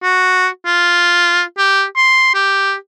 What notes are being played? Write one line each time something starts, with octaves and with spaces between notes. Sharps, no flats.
F#4
F4
G4
C6
G4